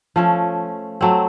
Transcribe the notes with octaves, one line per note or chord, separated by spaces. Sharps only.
F3 A3 C#4
F#3 A3 C4